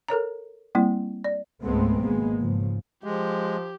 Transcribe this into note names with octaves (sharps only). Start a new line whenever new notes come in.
A4 A#4 C#5 A#5
G3 A#3 C4 E4
D5
C#2 G#2 G#3 A3 B3 C4
G#1 B2 G#3 A#3 B3
G#2 C#3 F3
F3 G#3 G4